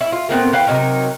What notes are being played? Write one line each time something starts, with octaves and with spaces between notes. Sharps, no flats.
E4
F4
A2 B3 C4 A#4
E3 B4 F5 G5
C3 F#3 D#4 A#4